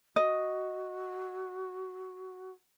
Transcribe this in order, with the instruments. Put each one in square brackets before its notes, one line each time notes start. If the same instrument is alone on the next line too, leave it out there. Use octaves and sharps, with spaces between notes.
[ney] F#4 [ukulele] D#5